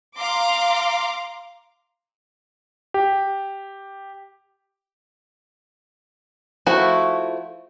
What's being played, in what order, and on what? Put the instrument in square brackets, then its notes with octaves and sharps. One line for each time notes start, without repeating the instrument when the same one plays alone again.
[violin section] F5 A#5 C6 D6
[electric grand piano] G4
[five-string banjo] F3 A3 E4 F#4